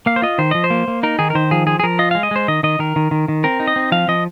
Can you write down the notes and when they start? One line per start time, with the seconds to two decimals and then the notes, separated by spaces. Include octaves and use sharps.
0.06 A#3 F5
0.16 C5
0.22 F4 D#5
0.38 D#3 C5
0.51 F3 D#5
0.64 C5
0.70 A#3
0.88 A#3
1.03 D#4 A#4
1.19 D#3 G#4
1.30 A#4
1.35 D#3 C5
1.51 F3 G#4
1.67 F3 G#4
1.80 G#4
1.83 F3 A#4
1.99 F4 D#5
2.11 G#3 F5
2.23 D#5
2.31 G#3 C5
2.48 D#3 D#5
2.63 D#3 D#5
2.79 D#3 A#4
2.96 D#3
3.11 D#3
3.28 D#3
3.44 C4 A#4
3.60 D#4
3.67 D#5
3.76 C4
3.92 F3 F5
4.08 F3 D#5